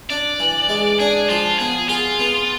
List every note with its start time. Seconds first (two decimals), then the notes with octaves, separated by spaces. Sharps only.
0.10 D4 D5
0.40 E3
0.69 G#3
0.99 D4 G#4
1.30 F3 F4
1.59 B3 G#4
1.89 F4 G#4
2.20 B3